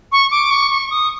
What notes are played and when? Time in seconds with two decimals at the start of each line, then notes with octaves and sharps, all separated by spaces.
0.12 C#6
0.31 D6
0.51 C#6
0.71 C#6
0.90 D#6